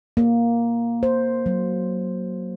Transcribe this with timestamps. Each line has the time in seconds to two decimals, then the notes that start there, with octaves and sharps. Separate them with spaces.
0.17 A#3
1.03 C5
1.46 F#3